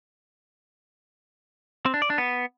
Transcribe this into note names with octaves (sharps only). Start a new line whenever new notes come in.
C4
D4
D5
D4
B3